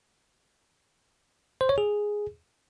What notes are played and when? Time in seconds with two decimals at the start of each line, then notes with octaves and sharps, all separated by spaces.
1.61 C5
1.69 C#5
1.78 G#4